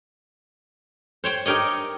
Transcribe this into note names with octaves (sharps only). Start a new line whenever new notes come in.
C5 C#5 G5 C6
D#4 G4 A#4 C#5 D#5